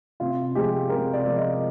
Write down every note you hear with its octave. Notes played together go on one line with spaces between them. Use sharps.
C3 F4
F3 G#3 G4
C3 A#4
D5
F3 G#3
D#5